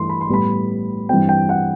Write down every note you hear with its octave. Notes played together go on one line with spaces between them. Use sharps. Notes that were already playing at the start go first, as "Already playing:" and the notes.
Already playing: G2 E3 A3 C6
B5
C6
A2 G3 B3 B5
G2 E3 G3 C4 G5
G5
F#5